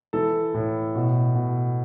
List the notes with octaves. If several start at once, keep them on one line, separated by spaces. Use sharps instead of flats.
E3 A4
A2
B2
B2